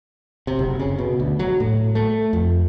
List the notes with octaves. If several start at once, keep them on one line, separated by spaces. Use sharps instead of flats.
C3
F#1
C#3
B2
D2
F#3
A2
A3
F2